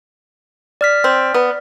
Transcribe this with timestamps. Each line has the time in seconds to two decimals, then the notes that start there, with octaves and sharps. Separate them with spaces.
0.81 D5 F6 B6
1.04 C4
1.34 B3